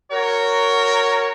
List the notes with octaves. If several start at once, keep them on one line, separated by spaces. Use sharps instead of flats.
F#4 A#4 C#5